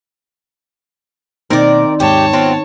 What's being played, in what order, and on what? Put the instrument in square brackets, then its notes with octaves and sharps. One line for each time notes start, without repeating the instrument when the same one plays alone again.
[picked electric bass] B2 A#3 [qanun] D#3 C4 [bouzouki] A#4 D5
[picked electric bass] D#2 G#2 G#3 [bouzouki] G4 [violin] C#5 A5
[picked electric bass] G#1 B3 [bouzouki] F#3 C4 F4